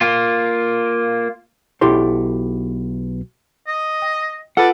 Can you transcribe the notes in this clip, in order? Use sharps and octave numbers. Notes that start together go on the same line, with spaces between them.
A#3 F4
B1 E4 G4 A4 C6
D#5
G5
F4 A4 B4 D5 F#5 E6